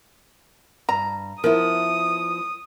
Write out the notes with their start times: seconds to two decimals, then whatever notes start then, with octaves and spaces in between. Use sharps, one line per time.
0.89 G2 A#5
1.44 F3 B3 E4 A#4 D#6